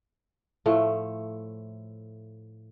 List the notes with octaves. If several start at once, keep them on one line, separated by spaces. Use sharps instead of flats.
A2 F3 A3